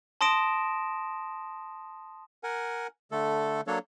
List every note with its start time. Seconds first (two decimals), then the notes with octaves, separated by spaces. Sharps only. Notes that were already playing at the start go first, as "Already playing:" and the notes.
0.21 A5 C6 D#6 A#6 D7 E7
2.43 A#4 F#5 G#5
3.11 D3 A3 A4
3.67 F#3 A#3 D4 A4 C#5